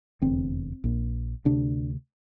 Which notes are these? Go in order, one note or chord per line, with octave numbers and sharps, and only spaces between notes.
F1 E2 D3 C4
A#1 A#2
D2 C3 D4